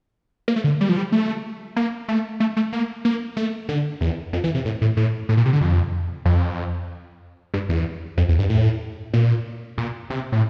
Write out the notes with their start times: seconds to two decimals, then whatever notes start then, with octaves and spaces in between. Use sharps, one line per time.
0.48 A#3
0.56 A3
0.64 D3
0.81 G3
0.89 F3
0.97 G3
1.12 A3
1.76 A#3
2.08 A3
2.40 A3
2.57 A3
2.73 A#3
3.05 A#3
3.37 A3
3.69 D3
4.01 E2
4.33 F2
4.44 E3
4.55 C3
4.65 A2
4.82 A2
4.97 A2
5.29 A2
5.37 A#2
5.45 C3
5.53 D3
5.61 F2
6.25 F2
7.54 G2
7.69 E2
8.17 F2
8.29 E2
8.39 G2
8.49 A2
9.13 A#2
9.78 A#2
10.10 C3
10.32 A2